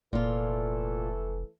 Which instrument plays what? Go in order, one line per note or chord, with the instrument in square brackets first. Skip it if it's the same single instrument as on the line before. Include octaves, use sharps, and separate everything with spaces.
[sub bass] F1 [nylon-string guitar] A#2 F4 [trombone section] E3 A3 A4